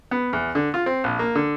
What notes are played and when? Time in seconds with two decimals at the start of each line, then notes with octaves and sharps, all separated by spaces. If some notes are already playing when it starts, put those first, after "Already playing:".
0.11 B3
0.33 E2
0.55 D3
0.74 F4
0.86 C4
1.04 A#1
1.19 A#3
1.35 D3